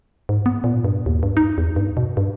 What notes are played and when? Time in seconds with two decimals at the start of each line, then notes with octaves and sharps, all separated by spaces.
0.29 G#2
0.46 B3
0.64 A#2
0.85 G2
1.06 D#2
1.23 G2
1.37 D#4
1.58 E2
1.76 G2
1.97 B2
2.17 G2